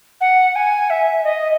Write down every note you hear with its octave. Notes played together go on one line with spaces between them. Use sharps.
F#5
G#5
E5
D#5